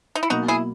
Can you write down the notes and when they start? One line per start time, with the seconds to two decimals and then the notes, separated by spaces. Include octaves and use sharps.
0.15 D#4
0.23 E4
0.30 B2 F#3 A#3 D#4 F#4
0.48 E4 G#4